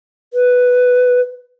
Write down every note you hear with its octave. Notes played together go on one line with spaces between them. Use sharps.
B4